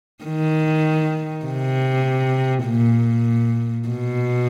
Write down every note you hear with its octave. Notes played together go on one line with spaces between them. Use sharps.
D#3
C3
A#2
B2